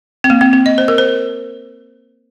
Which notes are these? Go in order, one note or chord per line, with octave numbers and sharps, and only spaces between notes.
C4
A#3
C4
C4
D#5
C5
A#4
C5